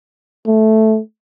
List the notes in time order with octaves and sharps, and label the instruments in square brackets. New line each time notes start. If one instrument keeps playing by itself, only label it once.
[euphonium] A3